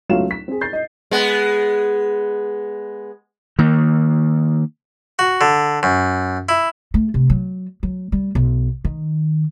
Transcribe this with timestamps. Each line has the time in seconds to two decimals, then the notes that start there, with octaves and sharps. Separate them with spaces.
0.09 C#2 F#3 A3 F4 F5 E7
0.31 B6
0.48 C4 G#4
0.61 G6 A6 C7
0.73 D#5
1.11 G#3 B3
3.59 D#3 A#3
5.19 F#4
5.41 D3
5.83 F#2
6.49 E4
6.94 A3
7.14 C3
7.30 F#3
7.83 F#3
8.12 G3
8.35 B1
8.85 D#3